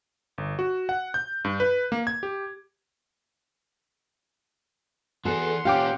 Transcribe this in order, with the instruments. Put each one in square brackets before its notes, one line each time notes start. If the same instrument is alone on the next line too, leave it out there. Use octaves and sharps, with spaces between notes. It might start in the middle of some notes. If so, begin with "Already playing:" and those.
[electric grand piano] G1
F#4
F#5
G6
G2
B4
A#3
G#6
G4
[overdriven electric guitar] E3 G#4 [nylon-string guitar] B3 F#4 A4 [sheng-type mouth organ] F#5 C6
[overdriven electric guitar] A#2 C#4 [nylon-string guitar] G4 [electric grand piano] F5 G5 D6